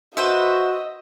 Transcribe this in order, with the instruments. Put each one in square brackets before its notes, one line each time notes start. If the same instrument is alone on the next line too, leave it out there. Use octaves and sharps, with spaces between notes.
[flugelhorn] F#4 [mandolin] B4 C5 E5 [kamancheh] D#5